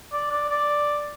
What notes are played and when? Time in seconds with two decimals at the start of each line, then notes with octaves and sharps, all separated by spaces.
0.12 D5
0.31 D5
0.49 D5